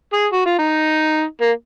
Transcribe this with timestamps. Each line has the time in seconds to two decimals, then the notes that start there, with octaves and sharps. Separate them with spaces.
0.13 G#4
0.33 F#4
0.46 F4
0.59 D#4
1.41 A#3